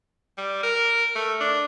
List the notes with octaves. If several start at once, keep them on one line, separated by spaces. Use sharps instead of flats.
G3
A#4
A3
D4